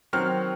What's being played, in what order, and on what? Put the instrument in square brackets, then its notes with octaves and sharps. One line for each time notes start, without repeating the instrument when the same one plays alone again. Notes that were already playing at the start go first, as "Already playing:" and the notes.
[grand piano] D#3 F#3 C4 F6